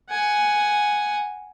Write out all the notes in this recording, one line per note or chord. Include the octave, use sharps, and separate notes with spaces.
F#5 G#5